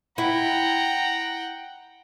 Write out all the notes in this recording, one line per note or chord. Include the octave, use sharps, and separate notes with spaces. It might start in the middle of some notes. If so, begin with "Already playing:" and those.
E4 F#5 G5 A#5